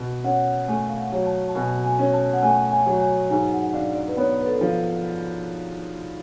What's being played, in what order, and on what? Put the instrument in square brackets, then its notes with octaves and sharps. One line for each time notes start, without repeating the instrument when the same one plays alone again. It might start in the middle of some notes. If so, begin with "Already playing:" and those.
Already playing: [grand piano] B2
[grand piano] C#4 [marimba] F#5
[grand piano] A3 [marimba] G#5
[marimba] F5
F#5
[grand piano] F#3
[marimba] A5
A5
[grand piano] B2 [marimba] G#5
[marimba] G#5
[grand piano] C#4
[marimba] A5
F#5
[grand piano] A3 [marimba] G#5
[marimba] G#5
[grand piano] F#3
[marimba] G#5
[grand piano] G#2 [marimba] G#5
[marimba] F#5
[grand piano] D4 [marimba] F5
[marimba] D5
B4
[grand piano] B3 [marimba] C#5
[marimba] B4
A4
[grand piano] F3